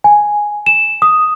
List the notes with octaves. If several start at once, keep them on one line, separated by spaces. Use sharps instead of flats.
G#5
E7
D#6